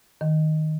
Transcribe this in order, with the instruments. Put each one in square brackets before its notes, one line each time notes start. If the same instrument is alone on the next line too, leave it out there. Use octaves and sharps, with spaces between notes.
[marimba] D#3